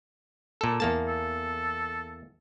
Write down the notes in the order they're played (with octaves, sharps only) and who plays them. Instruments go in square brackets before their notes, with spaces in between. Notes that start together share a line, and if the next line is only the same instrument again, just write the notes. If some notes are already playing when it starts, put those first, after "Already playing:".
[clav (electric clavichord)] A#2 A4
E2 A#3 A5
[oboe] A4